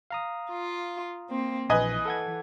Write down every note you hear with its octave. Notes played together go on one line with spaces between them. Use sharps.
F5 A#5 D#6
F4
A#3 C4
A#1 E3 B4 D#5 G#5
A4 F#5 G#6